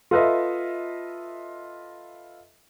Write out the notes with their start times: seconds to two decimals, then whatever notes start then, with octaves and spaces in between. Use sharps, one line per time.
0.11 F4 A4 B4 D#5 E5